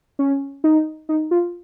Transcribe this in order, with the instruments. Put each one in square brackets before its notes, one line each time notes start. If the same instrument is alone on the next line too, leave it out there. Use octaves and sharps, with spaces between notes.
[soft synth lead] C#4
D#4
D#4
F4